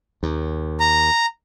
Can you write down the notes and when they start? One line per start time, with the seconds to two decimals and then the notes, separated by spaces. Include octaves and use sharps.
0.23 D#2
0.80 A#5